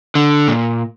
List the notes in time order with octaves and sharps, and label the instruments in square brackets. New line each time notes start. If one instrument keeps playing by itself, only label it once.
[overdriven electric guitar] D3
A#2